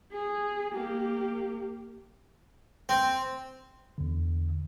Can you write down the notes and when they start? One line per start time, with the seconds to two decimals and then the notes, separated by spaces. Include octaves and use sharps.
0.12 G#4
0.73 A#3 G4
2.89 C4
3.98 E2 D3